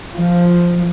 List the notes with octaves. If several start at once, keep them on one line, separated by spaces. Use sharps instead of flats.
F3